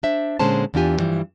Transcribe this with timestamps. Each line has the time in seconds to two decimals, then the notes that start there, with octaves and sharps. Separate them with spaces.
0.03 D4 C5 E5
0.39 A#2 D3 G#3 C#4 C5 A5
0.74 E2 E3 D4 F4 G4 G#5
0.98 G2 B2 E3 F3 G3